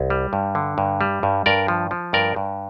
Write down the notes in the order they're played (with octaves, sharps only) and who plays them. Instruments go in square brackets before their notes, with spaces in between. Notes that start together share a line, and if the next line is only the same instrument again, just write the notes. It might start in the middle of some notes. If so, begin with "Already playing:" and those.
Already playing: [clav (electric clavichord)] C2
G3
G2
D3
G2
G3
G2
G2 A#4 D5
F3
F3
G2 A#4 D5
G2